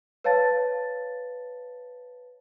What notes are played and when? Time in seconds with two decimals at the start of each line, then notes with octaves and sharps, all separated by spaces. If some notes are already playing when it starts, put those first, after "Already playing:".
0.24 B4 C#5 F5 A5 A6